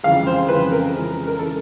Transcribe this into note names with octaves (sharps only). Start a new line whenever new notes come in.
F2 C#3 E3 G#3 F5
C5
F2 C#3 E3 G#3 B4
A#4
F2 C#3 E3 G#3
A#4
C#3 E3 G#3 A4